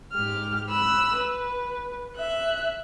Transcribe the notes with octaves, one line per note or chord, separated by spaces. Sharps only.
G#2 G4 F6
B5 E6 F#6
B4
E5 F#6